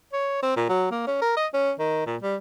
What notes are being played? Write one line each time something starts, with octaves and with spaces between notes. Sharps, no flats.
C#5
C4
A#2
F#3
A#3
C#4
A#4
D#5
C#4
D#3
A#2
G3